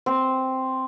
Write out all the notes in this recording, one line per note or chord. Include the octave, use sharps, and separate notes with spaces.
C4